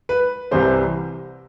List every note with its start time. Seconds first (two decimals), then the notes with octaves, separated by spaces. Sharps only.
0.09 B4
0.51 C2 C3 E3 G3 C5